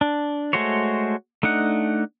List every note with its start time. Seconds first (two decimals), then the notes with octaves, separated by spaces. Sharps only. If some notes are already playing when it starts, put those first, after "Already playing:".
0.01 D4
0.53 G#3 A3 F#4 C5 C#5
1.43 A3 D4 D#4 F#5